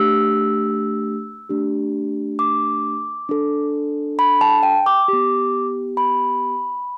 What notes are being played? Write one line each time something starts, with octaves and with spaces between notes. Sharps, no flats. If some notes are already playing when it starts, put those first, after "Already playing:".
Already playing: A3 D4 G4 E6
A3 D4 G4
D6
D4 A4
B5
A5
G5
D6
B3 G4
B5